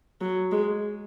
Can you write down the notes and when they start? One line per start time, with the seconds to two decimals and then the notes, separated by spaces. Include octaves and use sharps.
0.21 F#3
0.52 G#3